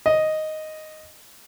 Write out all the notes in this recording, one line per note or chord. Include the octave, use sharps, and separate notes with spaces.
D#5